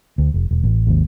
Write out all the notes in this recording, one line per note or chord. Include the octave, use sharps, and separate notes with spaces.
D2
F1
E1
A1
G#1 D#2